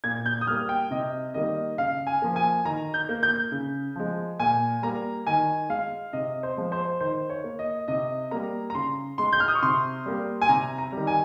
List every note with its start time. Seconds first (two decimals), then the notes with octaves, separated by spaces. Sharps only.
0.04 A#2 G#6
0.26 G6
0.41 D#6
0.47 G3 A#3 F6
0.69 G5
0.91 C3 D#5
1.34 D#3 G3 A#3 D#5
1.78 C#3 F5
2.07 G#5
2.22 F3 A#3
2.36 G#5
2.65 D#3 A#5
2.94 G6
3.09 A#3
3.23 G6
3.52 C#3
3.96 F3 G#3
4.40 A#2 G#5
4.82 G3 A#3 A#5
5.27 D#3 G#5
5.69 G#3 F5
6.13 C3 D#5
6.43 C5
6.57 F3 G#3
6.72 C5
7.01 D#3 C5
7.30 C#5
7.44 A#3
7.59 D#5
7.88 C3 D#5
8.31 G3 A#3 A#5
8.70 A#5
8.75 C#3 C6
9.18 G#3 C6
9.33 G6
9.40 F6
9.48 D#6
9.55 C#6
9.63 C3 C6
10.06 G3 A#3
10.42 G#5
10.49 C3 A#5
10.78 A#5
10.92 D#3 G3
11.07 G#5